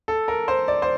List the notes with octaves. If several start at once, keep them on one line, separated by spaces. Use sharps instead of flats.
A4
A#4
C5
D5
C5